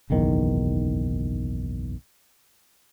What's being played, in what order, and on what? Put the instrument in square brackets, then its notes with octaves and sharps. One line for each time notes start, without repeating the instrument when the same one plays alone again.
[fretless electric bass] F#1 B1 E2 D#3